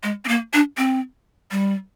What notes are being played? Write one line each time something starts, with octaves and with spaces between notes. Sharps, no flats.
G#3
C4
A#3
D4
C4
G3